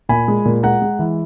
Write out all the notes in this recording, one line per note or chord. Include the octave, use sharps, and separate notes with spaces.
A#2 G#5 B5
G#3
A#2
G#3 F#5 A#5
G#3
E3